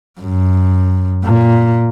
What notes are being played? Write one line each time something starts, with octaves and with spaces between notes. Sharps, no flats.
F#2
A#2